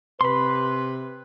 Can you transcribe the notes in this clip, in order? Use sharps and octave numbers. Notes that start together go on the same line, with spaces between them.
C3 B4 B5 C6